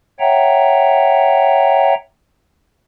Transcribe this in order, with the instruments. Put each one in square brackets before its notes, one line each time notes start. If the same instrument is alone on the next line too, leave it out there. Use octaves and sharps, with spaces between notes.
[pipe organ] C#5 E5 F#5 G5 A#5